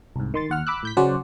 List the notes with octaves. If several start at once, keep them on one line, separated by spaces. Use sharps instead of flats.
C2 G#2
D#3 C6 A6
D#2 F#5 F6
B5 D6 E6 F#6
A2 G6 B6
C#3 F#3 C#4 C5 D5 F#5